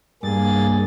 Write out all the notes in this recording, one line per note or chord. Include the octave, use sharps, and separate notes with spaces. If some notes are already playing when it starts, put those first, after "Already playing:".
G2 A#3 G#4 A6